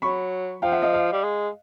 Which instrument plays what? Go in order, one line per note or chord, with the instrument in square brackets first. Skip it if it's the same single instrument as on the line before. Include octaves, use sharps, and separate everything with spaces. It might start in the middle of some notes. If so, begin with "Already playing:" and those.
[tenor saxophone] F#3 [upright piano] B5 C#6
[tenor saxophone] F3 [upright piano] F5 G5
[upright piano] E5 F#5
D#5 F5
D#5 F5
[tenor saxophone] G3
G#3